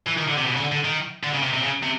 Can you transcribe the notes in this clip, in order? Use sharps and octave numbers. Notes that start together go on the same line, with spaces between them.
E3
D#3
D3
C3
B2
C#3
D3
D3
D#3
D3
C#3
C3
C3
C#3
C3